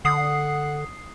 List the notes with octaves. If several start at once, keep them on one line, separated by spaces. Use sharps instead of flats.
D3 F#5 D#6 C7